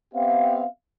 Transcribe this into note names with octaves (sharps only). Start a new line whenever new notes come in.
B3 C4 G4 E5 F5